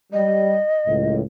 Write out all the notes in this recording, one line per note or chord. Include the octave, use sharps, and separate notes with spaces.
G3 D#5
C#2 F#2 A2